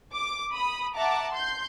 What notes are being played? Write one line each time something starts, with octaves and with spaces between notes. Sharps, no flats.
D6
B5 D#6
E5 F#5 A5 A#5 D6
C6 G6